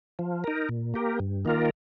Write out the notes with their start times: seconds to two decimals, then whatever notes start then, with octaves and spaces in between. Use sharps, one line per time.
0.19 F3
0.44 D#4 A#4
0.69 A#2
0.94 A#3 G4 A#4
1.20 G2
1.45 D#3 A#3 F4 A#4